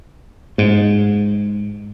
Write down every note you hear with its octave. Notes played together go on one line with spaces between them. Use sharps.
G#2